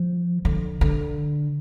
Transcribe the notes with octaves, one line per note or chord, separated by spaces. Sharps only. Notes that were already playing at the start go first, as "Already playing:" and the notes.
Already playing: F3
D3
D3